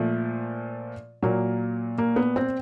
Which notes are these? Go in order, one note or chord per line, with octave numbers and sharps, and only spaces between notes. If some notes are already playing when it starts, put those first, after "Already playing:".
Already playing: A#2 F3 A3
A#2 F#3 A#3
A#3
B3
C4